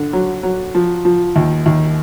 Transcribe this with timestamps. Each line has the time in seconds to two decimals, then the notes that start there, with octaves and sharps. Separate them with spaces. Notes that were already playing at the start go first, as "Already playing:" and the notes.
Already playing: D3
0.13 F#3
0.43 F#3
0.75 F3
1.05 F3
1.36 D#2
1.66 D#2